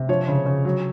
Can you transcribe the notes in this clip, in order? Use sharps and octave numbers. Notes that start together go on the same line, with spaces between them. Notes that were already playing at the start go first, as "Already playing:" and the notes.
Already playing: C3
F3 C#5
C#3
C#3
F#3